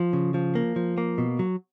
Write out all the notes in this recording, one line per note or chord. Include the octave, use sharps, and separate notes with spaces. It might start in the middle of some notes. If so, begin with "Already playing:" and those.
Already playing: F3
C#3
F3
A#3
F3
A#3
B2
F#3